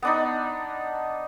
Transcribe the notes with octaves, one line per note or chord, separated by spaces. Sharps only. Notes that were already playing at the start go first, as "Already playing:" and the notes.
B3 D4 D#4